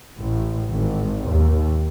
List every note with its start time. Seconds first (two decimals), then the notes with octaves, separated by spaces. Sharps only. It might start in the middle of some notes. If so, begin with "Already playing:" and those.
0.20 A1
0.70 G#1
1.28 D#2